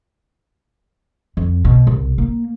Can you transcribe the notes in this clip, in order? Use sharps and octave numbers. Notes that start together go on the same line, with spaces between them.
F2
B2
C2
A#3